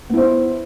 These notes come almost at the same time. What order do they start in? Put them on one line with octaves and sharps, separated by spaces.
B3 E4 C5